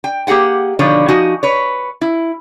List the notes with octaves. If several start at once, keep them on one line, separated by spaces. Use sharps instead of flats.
G5
A#3 G4 G#4 F#5 G5
B2 D3 D#3 F3 C#5
F3 D#4 F#4 G#5
B4 C#5
E4